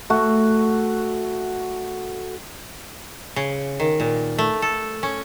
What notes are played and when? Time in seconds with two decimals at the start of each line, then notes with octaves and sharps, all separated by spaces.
0.10 A3 F#4
3.36 C#3
3.80 D#3
4.00 A#2
4.38 A3
4.62 A4
5.03 C#4